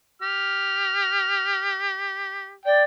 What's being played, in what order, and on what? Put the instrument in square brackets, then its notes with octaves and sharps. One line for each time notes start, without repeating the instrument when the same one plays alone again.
[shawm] G4 [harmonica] F6
[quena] D5 [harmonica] G5